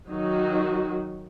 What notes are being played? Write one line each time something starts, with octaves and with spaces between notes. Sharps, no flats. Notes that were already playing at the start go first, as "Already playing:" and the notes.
D#3 F#3 D#4 F#4